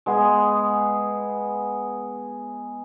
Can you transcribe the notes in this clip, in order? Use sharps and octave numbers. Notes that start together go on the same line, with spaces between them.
G#3 B3 G#4